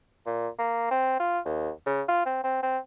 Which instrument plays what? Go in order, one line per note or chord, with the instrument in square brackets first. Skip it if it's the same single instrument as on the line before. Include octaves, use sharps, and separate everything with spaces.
[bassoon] A#2
A#3
C4
F4
D#2
C#3
F4
C4
C4
C4